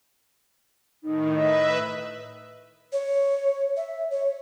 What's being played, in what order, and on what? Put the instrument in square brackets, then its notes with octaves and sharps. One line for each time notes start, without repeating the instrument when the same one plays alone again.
[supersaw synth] A2 D#3 [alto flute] D#4
[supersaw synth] B4 E5 [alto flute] D#5
[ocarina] C#5
E5
C#5